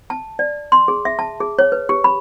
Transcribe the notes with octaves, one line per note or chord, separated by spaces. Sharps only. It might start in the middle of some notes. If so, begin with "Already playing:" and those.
A5
D5
C6
G#4
E5
A5
G#4
C#5
B4
G4
B5